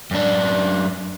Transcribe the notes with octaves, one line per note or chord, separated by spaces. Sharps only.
F#2 D4